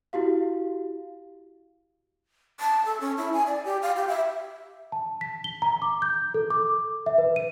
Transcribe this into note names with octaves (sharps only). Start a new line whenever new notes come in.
E4 F#4 G4 F5
A5
A4
C#4
E4
G#5
D5
G4
F5
G4
E5
A5
B6
G7
A#5
D6
G6
A4
D6
E5
B4
D#7